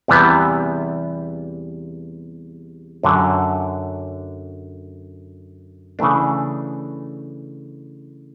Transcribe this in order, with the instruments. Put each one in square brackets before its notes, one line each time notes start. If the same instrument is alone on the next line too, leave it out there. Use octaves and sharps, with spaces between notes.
[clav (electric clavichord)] E2 C3 E3 G3 B3
F#2 D3 F#3
C#3 E3 A3 D4